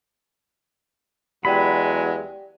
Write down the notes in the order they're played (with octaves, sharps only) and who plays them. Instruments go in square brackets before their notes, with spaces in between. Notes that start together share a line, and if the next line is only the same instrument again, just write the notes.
[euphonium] E2 [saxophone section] F#3 G#3 [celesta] G4 D5 G5 [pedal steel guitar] B5